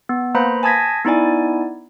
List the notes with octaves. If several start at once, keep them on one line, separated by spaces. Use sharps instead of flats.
B3
A#3 B4 C5 A#5 B5
G#5 A5 D#6 G#6 A#6 B6
B3 D#4 E4 D5 G#5